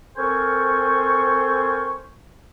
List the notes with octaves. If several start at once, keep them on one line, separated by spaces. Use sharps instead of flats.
C4 A4 A#4 C5 G#5 C#6